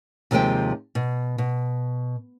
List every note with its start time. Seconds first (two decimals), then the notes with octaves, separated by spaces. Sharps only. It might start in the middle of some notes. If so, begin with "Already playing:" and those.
0.31 D#2 C3 F3 G#3 C5 G5
0.95 B2
1.38 B2